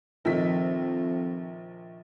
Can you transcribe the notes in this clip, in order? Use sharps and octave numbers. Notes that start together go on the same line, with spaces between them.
A#1 F2 D#3 B6